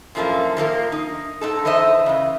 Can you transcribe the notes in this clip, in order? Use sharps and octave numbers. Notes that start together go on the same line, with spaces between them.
F#2 A2 F3 A3 A#3
D#3 F3 A#3 A#4
D#4
G#2 D#4 A4
E3 D#4 C5 D#5 E5
C#3 E3